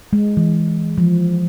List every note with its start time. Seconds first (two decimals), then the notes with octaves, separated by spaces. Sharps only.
0.13 G#3
0.37 E3
0.98 F3